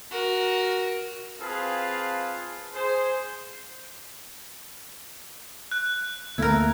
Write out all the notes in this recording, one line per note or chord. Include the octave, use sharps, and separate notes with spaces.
F#4 A#4
C4 F4 G#4 B4 F5 A5
G#4 C5
F#6
D2 A3 A#3 E4 A#4